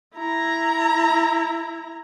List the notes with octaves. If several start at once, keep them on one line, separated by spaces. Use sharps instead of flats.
E4 A#5